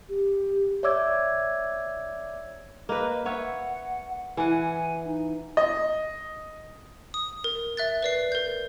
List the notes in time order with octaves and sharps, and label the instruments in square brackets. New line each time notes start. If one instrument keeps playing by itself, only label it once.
[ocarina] G4
[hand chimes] C#5 D5 E5 D6 E6 G#6
[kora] A#3 B4 [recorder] D#5
[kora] B4 C#5 E5 [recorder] F#5
[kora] E3 F#5 [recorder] G#5
[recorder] D#4
[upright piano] D#5
[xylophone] D#6
A#4
E5 F#6 A6
B4 D5 C7
A#4 G6